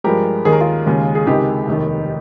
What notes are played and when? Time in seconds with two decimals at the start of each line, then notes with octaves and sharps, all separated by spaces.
0.04 G2 F3 G#3 G4 A#4
0.45 D#2 D#3 A#3 G#4
0.53 A#4
0.61 F4 G#4
0.86 D#2 C#3 G#3
1.15 G#4
1.27 C#2 C3 D#3 G#3 D#4 G4
1.67 F1 D#2 D#3